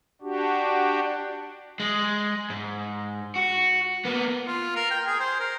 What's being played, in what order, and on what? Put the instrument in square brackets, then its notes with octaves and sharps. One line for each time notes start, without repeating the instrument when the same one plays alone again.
[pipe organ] D4 F#4 G4
[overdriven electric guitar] G#3
G#2
F#4
A#3 B3
[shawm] F4
A#4
G5
G#4
C5
A#4